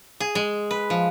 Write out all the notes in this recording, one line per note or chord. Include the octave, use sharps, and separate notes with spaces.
G#4
G#3
B4
F3